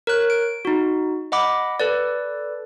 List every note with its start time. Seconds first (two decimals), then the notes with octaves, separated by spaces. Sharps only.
0.07 A#4 C#5 F#6
0.30 D7
0.65 D#4 F#4
1.32 D#5 F#5 B5 D6
1.80 A4 B4 D5